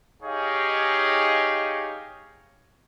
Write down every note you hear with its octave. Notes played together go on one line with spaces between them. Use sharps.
D#4 G4 G#4 C#5 D#5 F5